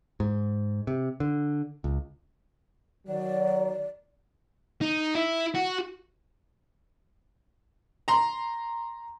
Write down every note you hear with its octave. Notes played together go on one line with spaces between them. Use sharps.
G#2
C3
D3
C#2
D#3 F#3 D5
D#4
E4
F#4
A#5 C6